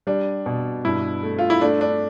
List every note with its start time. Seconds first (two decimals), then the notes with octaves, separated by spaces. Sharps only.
0.07 G3 D4
0.46 B2
0.85 G2 E4
1.23 A3
1.39 F4
1.50 E4
1.61 A3 D4
1.81 D4